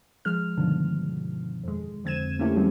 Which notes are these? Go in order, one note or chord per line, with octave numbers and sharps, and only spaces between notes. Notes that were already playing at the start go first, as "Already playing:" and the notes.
F3 G#3 F6
G2 B2 D3 D#3 F3
F2 G#3
F2 D3 C4 G#6 D#7 E7
A3 A#3 C#4 E4 G4 A4
E3 F3 G3 G#3 C4 C#4